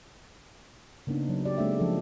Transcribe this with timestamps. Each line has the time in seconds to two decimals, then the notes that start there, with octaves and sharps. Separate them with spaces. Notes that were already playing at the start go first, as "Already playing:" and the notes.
1.07 C#3 A#3 B3 D4 D#4
1.29 F#3
1.45 G4 D5
1.58 G#3 A#3 C4 D4 A4 E5
1.79 F3 D4 A4